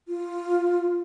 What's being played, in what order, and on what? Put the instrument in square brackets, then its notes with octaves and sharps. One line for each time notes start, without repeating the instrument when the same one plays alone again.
[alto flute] F4